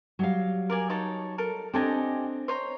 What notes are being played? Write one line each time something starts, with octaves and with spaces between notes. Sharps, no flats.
F#3 G3 F5
A#4 D5 G#5
D#4 C#5 A5
A4 A#4
C4 D4 G4 A4 D#5 G#5
C5 C#5 A#5